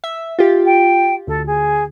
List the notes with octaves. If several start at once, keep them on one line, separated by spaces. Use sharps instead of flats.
E5
F4 G4
G5
D2 A4
G#4